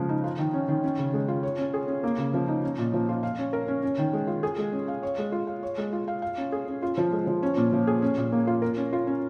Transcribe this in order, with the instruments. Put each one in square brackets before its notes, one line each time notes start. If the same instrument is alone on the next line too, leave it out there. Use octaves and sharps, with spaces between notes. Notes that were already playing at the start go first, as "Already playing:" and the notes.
Already playing: [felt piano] C#3 F3 G#3
D#4
F4
D#3
C#4
D#3
C#4
C#3
G#3
F4
C#5
C#4
G#4
C#4
A#3
C#3
F3
D#4
C#4
A#2
F3
F4
F5
C#4
A#4
C#4
C#4
D#3
G#3
F4
G#4
G#3
C#4
F5
C#5
G#3
F4
F5
C#5
G#3
F4
F5
F5
C#4
G#4
C#4
F4
F3
G#3
F3
C#4
A#2
F3
G#4
C#4
A#2
A#3
F4
A#4
C#4
F4
C#4